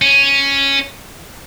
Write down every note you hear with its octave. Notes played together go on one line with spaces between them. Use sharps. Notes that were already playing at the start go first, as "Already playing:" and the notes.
C#4